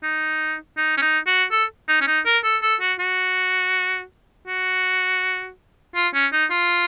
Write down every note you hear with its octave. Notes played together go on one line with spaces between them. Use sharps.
D#4
D#4
C#4
D#4
F#4
A4
D#4
C#4
D#4
A#4
A4
A4
F#4
F#4
F#4
F4
C#4
D#4
F4